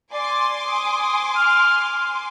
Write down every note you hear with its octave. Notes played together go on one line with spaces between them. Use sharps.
D5 G#5 C6 D6
D#6
F6